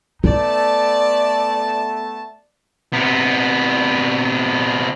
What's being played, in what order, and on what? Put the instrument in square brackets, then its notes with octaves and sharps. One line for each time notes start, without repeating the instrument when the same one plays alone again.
[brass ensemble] A3 B3 A5 [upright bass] D#4 [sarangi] D5
[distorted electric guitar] C3 B3